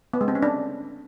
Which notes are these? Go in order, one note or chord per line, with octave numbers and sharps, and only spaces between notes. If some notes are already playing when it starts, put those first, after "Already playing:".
B3
G#3
C4
C#4
D4